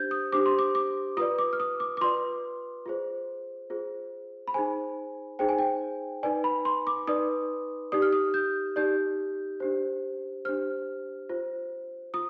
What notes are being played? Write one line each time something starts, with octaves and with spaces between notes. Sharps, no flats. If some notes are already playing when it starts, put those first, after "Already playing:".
Already playing: D4 G4 C5 G6 G#6
D#6
D4 G4 C5 D6
C6
D6
D6
F4 B4 D5 D#6
D6
F6
D#6
D6
D6
F4 B4 D5 C6
F4 G#4 C5
F4 G#4 C5
B5
D#4 G#4 C5 G#5
D#4 G#4 C5 G5
G#5
G5
D#4 B4 D5 G#5
B5
C6
D6
D#4 B4 D5 D#6
D#4 G4 D5 D#6
F6
D#6
G6
D#4 G4 D5 G6
D4 G4 C5
D4 G4 C5 F6
F4 C5
F4 D#6